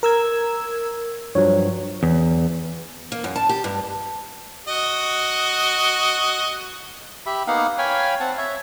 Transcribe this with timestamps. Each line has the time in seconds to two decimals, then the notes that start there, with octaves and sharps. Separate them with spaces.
0.03 A#4 E6 G#6
1.35 G2 F3 F#3 C#5
2.03 E2
3.12 A#3
3.24 F#2
3.36 A5
3.49 G4
3.64 G2
4.68 F#4 D#5
7.26 G4 E5 B5
7.47 A#3 B3 D#4 F5 F#5
7.78 C#5 F5 G5 G#5 B5 F6
8.20 C4 F#5 A5
8.37 C#5 E5